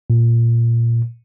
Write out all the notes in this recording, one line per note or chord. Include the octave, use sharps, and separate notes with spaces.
A#2